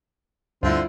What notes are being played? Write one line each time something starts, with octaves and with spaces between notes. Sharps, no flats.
D2 G2 D3 G3 C4 E4 F4